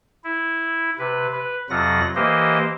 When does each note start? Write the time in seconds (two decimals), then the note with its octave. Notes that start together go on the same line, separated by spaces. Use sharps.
0.24 E4
0.99 C3 B4
1.32 B4
1.70 F2 C3 F#3 F4 F#5 A#6
2.16 E3 A#3 G4 C5 D#5